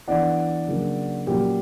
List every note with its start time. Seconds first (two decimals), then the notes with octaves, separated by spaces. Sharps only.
0.08 E3 B3 D4 D5 F#5
0.68 C#3 F#3 A#3 D4
1.27 A#2 F#3 C#4 G4